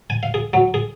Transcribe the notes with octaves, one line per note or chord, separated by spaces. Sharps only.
G#5
F5
G#4
F#3
G#4